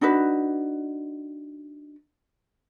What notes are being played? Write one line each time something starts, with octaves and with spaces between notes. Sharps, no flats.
D4 D#4 F#4 B4